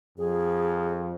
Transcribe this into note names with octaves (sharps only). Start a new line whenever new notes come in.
F2 G#4